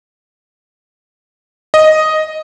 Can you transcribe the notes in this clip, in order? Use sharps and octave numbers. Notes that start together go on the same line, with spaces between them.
D#5